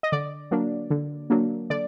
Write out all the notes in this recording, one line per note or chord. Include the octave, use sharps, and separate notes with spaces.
D#5
D3 D5
F#3 A#3 D4
D3
F#3 A#3 D4
D3 D5